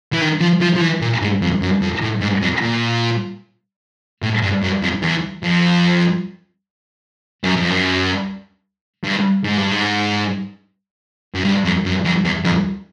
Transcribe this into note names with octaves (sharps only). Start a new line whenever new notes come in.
E3
D#3
F3
F3
F3
E3
A#2
G#2
F2
F#2
F2
A2
G#2
F2
A#2
A2
G2
F#2
F2
E2
F2
F#2
F2
F#2
G2
G#2
G2
G#2
F#2
G2
F2
F#2
F2
E2
F2